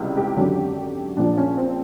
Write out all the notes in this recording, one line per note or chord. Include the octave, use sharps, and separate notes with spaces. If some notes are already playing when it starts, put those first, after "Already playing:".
Already playing: C#2 C3 E3 G3
G4
G#1 F#2 D3 F#3
A#1 A#2 F3 D4
C#4
C4